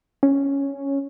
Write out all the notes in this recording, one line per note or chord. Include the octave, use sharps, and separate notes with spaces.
C#4